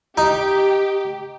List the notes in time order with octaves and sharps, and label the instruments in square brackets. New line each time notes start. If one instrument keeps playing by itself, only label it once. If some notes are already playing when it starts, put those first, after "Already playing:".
[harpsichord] D#4 [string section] G4